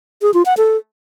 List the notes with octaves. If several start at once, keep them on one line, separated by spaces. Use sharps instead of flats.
G#4
F4
F#5
A4